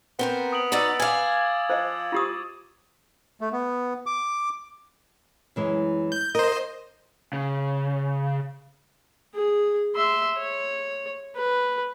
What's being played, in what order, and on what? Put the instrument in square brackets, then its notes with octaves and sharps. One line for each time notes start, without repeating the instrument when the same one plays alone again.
[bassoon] B3 [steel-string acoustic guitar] C4 A#4 C5
[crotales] D#6 D7 F#7
[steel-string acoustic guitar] D#4 F#4 D5 [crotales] E6 A6 D7
[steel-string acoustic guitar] F5 G#5 [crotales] D6 D#6 G#6
[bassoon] F3 [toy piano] C5 D#5
[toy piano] F4 G4 D#6 [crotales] C#6
[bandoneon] A3
B3
D6
[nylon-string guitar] F#2 E3 G#3
[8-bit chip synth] G6
[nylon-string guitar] A#4 [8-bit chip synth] C5 D#5
[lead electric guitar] C#3
[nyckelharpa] G#4
E5 C6
C#5
B4